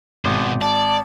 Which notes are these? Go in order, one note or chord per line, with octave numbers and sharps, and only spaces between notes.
G#1 B2 C5
D5 A5